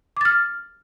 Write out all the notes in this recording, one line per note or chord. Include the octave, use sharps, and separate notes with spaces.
D6 F6 A6